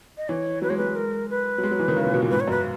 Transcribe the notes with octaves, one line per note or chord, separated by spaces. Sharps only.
D#5
E3 C#5
F#3 B4
G#3 C#5
F#3 B4
G#3
A#4
B4
F#3
G#3
F#3
E3
D#3
C#3
A#2
B2
A#2
G#2 B4
C#5
F#2
B4